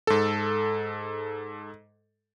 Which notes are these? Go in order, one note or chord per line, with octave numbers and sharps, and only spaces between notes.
G#2 A4